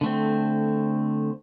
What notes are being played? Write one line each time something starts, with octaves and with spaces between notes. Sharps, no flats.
D3 A3 C4